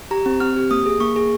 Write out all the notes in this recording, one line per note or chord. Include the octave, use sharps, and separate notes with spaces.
G4 A#5
C4
C4 F6
G4
A#3 D#6
G#4
A#3 C#6
G#4